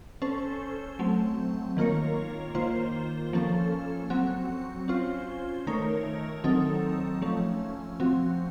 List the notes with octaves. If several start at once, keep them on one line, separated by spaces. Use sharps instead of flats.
C#4 A4 C5
F#3 A3 C4
D#3 A#3 F4 A#4 C#5
D#3 A#3 F4 C5
F3 A#3 C#4 A4
F#3 C4 F#4
C#4 F4 C5
D#3 A3 D#4 A#4 C#5
D#3 F#3 C4 D#4 A4
F3 A3 C#4
F3 C4 F#4